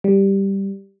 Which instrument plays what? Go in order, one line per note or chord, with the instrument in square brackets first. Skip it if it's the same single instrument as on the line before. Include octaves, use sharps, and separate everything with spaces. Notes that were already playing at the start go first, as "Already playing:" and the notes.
[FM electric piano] G3